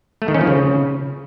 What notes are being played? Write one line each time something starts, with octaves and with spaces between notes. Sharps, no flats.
A3
D#3
C#4
F3
C#3